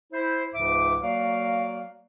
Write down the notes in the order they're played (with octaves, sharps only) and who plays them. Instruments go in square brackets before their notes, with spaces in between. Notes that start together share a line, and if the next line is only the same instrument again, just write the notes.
[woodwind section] E4 C5
C#2 G#2 C#3 E3 E5 D6
F#3 A#3 F#4 D5 F5